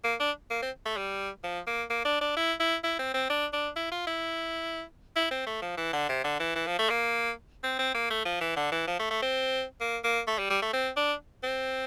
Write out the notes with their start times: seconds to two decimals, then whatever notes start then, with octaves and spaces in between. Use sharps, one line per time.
0.04 A#3
0.20 D4
0.51 A#3
0.62 C4
0.86 A3
0.97 G3
1.44 F3
1.67 A#3
1.90 A#3
2.05 D4
2.21 D4
2.36 E4
2.60 E4
2.83 E4
2.99 C4
3.14 C4
3.30 D4
3.53 D4
3.76 E4
3.92 F4
4.07 E4
5.16 E4
5.31 C4
5.47 A3
5.62 F3
5.77 E3
5.93 D3
6.09 C3
6.24 D3
6.40 E3
6.55 E3
6.67 F3
6.79 A3
6.90 A#3
7.63 C4
7.79 C4
7.95 A#3
8.10 A3
8.25 F3
8.41 E3
8.56 D3
8.72 E3
8.87 F3
8.99 A3
9.11 A3
9.22 C4
9.81 A#3
10.04 A#3
10.27 A3
10.39 G3
10.50 G3
10.62 A3
10.73 C4
10.97 D4
11.43 C4